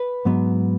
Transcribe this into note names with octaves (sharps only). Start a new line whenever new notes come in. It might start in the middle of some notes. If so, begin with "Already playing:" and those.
Already playing: B4
G#2 F#3 B3